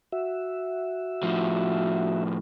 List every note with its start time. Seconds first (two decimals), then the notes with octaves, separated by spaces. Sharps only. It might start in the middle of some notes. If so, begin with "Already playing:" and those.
0.12 F#4 E5
1.23 A2 F3